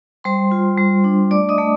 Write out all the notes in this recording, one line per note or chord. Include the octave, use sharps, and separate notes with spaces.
G3 C5 C6
F4
G3
D4
A3 D5 D6
D#5 D#6
A3